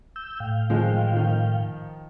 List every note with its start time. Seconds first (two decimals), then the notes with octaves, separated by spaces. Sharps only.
0.16 E6 G6
0.40 A2 F5 G5
0.70 D#3 F3 G#3
1.13 D#3 F3